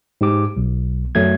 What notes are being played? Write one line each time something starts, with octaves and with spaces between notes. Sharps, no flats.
G#2 G4 D6
B1
F#2 F#3 A3 G#6